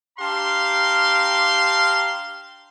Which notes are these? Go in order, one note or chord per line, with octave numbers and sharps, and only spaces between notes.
D4 G4 F5 A#5 C6